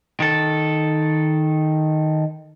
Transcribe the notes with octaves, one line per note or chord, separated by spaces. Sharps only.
D#3 A4